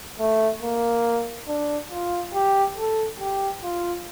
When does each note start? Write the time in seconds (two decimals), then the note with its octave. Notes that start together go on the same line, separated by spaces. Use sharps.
0.19 A3
0.62 A#3
1.48 D4
1.91 F4
2.34 G4
2.77 A4
3.20 G4
3.63 F4